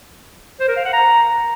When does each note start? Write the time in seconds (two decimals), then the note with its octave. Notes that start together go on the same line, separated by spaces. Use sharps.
0.60 C5
0.68 A#4
0.77 F5
0.85 F#5
0.93 A#5